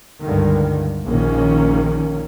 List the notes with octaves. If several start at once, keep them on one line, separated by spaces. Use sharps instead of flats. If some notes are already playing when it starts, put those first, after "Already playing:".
C#2 G2 D3 D#3
A#1 D#3 A#3 C#4